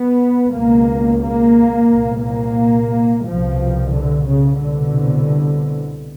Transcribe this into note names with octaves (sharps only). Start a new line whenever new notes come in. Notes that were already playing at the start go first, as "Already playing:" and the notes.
Already playing: B3
C#2 B2 A#3
A#3
C2 A#2
A#3
C2 B2 F3
D3
C#3
C2 B2 D3